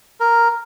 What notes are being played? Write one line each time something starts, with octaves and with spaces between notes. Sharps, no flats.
A#4